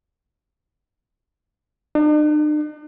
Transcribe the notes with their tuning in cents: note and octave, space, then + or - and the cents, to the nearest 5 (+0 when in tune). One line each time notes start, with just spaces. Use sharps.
D4 +45